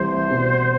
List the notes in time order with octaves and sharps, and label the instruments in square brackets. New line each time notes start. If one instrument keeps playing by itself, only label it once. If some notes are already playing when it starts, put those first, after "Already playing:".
Already playing: [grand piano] C2 C3 E3 A3 E4 [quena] C5
[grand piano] B2 G3 B3